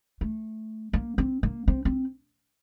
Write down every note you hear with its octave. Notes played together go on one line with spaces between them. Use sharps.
A3
A#3
C4
A#3
C4
C4